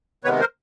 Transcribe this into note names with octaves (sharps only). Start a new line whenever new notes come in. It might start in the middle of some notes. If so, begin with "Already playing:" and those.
C3 D#3 G#3 B3 B4 C#5
A#4 C5